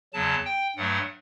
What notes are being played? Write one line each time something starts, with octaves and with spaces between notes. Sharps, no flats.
E2 C#3 F#3 A5
G5
G2 F#3 A3 F#5